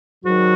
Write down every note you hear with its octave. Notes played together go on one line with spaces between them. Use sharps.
G#2 D#3 F#3 F#4